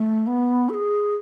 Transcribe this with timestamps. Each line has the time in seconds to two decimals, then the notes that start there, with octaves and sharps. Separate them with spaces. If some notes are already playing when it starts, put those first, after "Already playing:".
Already playing: A3
0.27 B3
0.69 A4
0.74 G#4